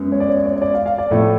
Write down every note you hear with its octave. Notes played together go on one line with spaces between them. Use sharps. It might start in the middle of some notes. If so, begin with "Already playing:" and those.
Already playing: F#2 G#3 B3
C#5
D5
C#5
D5
C#5
C#5
D5
F5
F5
D5
A2 F3 A3 A4